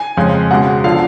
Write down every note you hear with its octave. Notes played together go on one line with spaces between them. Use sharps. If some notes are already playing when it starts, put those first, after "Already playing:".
Already playing: G#5
F2 C#3 G#3
C#2 B2 G#3 F#5
D3 F3 F5